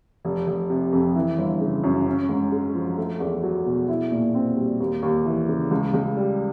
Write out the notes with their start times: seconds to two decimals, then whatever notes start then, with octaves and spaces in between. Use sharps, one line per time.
0.25 F1
0.47 F1
0.70 C3
0.92 F2
1.15 E3
1.38 G1
1.61 C#3
1.84 F#2
2.06 C#4
2.29 G#2
2.52 G#3
2.75 F3
2.97 A3
3.20 E2
3.43 F#3
3.66 B2
3.88 E4
4.12 A#2
4.35 C4
4.57 G3
4.80 D#2
5.02 D#2
5.26 E3
5.48 C#3
5.71 C#2
5.94 C#2
6.16 G3